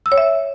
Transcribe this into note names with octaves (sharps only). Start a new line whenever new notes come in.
E6
C#5
E5